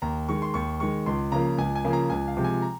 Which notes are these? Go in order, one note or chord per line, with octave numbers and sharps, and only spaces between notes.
D#2 A#5
D#3 G#3 C#6
C6
D#2 C#6
D#3 G#3 C#6
C#2 C6
C#3 F3 A#3 A#5
C#2 G#5
G#5
C#3 F3 A#3
A#5
C#2 G#5
F5
C3 F3 G#3
G#5
A#5